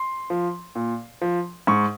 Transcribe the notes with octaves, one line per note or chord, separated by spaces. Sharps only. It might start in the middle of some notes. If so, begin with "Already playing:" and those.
Already playing: C6
F3
A#2
F3
G#2 C#6